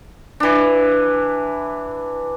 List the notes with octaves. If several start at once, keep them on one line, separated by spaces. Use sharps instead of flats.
E3 D4